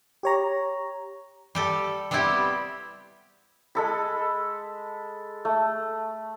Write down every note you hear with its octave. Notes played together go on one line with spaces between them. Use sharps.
G4 C#5 A#5
G3 G4 A4
G3 B3 C4 E4 G4
G#3 A4 B5
A3